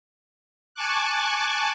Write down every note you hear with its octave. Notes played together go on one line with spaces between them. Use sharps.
G#5 A5 C#6 D6 F#6